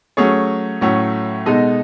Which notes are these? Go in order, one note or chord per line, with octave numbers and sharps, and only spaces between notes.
F#3 A3 C#4 G#4 C#5
A2 F#3 A3 C#4
B2 G#3 D#4 A4 D#5